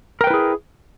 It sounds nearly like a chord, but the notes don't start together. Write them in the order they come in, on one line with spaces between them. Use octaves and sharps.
A#4 G5 B4 E4 G#4